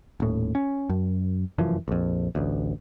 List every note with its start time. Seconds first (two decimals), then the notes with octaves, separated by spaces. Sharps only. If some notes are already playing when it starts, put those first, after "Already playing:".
0.20 D#1 A2
0.55 C#4
0.90 F#2
1.58 F1 F#2 E3 F3
1.88 A#1 F2
2.35 A1 D2